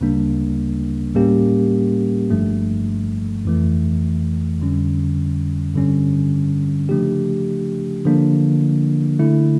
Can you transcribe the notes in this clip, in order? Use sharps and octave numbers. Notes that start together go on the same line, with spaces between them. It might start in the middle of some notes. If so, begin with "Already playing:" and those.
D2 C#3 G3 A#3 D4
A2 G3 A#3 C#4 G4
G1 G2 F3 A3
F2 E3 A3
F2 D3 G3 C#4
G2 D3 G3 C#4
C#3 F3 A3 D4 G4
D3 F3 A#3 D4
D3 A3 E4